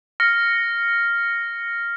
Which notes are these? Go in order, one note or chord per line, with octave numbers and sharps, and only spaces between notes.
F6 A#6 C#7